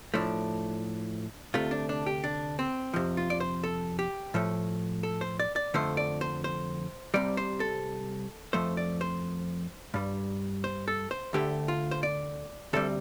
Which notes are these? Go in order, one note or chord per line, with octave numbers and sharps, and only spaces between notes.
A2 F3 A3 D4
D2 C3 A3 F4
D4
D4
G4
D4
C4
F2 C3 F3
F4
D5
C5
A4
G4
A2 F3 A3
A4
C5
D5
D5
F2 D3 F3 A3 C5
D5
C5
C5
C2 C3 G3 D5
C5
A4
F2 F3 A3 C5
D5
C5
G2 G3
C5
A4
C5
D2 D3 A3 G4
F4
C5
D5
D2 C3 G3 A4